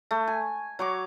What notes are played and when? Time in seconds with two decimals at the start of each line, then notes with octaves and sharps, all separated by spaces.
0.11 A3
0.28 G#5
0.79 F#3 C#5 D6